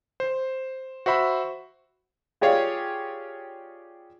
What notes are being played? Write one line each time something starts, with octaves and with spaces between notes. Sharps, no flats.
C5
F#4 C5 E5 B5
F4 G4 G#4 C#5 D5 F5